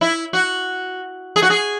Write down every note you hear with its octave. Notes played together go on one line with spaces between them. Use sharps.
E4
F#4
G#4
F#4
G#4